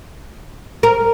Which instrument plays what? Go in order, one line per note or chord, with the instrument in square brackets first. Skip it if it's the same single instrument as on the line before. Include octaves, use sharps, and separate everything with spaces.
[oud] A#4